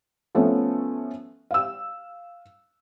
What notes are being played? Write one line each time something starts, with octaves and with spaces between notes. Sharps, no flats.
F3 A3 B3 C#4
F5 E6